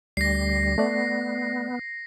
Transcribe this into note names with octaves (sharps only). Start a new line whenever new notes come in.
D2 G3 A#6 C7
A3 B3 D5